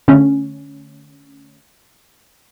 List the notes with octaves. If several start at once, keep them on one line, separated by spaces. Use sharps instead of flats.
D3 A3 C#4